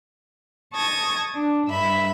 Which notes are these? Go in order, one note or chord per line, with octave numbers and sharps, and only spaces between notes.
A5 C#6 D#6 G#6 A#6
D4
G2 E5 B5